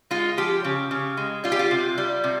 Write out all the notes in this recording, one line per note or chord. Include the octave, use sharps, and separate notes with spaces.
G#3 F4
F3 G4
C#3
C#3
G#3
G3 F4
G4
F4
C3
G3
C3